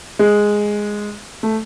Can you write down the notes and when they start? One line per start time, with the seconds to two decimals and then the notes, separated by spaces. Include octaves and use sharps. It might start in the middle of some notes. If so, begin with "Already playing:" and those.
0.19 G#3
1.43 A3